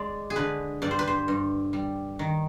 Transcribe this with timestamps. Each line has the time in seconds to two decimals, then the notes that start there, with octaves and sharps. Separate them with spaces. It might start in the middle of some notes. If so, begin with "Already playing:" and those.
Already playing: G#3 D5
0.30 G#4
0.36 D3 B4
0.82 G2 D5
0.91 C5
0.99 B4
1.07 C5
1.28 G2
1.73 G3
2.19 D#3